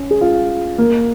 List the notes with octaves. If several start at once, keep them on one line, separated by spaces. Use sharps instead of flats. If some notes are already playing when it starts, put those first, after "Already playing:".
Already playing: C#4
G#4
F4
A#3